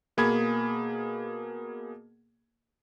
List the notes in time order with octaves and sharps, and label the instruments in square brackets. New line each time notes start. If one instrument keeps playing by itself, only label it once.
[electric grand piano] B2 A#3 G#4 B5 G#6